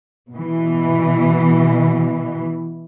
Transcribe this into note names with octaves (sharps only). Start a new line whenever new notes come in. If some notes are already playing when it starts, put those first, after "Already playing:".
B2 E3